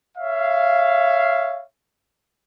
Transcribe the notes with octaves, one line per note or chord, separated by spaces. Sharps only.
C#5 E5 F5